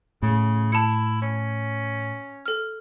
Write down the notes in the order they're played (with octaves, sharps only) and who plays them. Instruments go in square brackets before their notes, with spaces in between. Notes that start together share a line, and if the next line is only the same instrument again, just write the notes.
[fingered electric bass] A2 [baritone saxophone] C#3
[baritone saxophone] E4 [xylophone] A5 C#7
[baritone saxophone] C#4
[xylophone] A4 F6